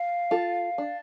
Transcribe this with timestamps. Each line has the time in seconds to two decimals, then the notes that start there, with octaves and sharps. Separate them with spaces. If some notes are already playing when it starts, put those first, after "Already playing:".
Already playing: F5
0.31 F4 A4
0.78 D4